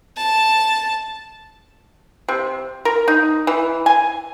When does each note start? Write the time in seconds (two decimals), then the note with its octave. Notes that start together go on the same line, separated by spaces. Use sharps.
0.17 A5
2.28 C3
2.85 A#4
3.08 D#4
3.47 E3
3.86 G#5